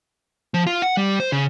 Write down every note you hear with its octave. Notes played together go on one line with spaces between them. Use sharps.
F3
F4
F#5
G3
C5
C#3